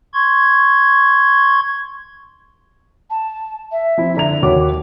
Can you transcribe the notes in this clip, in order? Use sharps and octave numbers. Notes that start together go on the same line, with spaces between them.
C6 C#6 G#6
A5
E5
F3 C4 E4
D3 A#5 F7
D#2 F#4 C#5 D6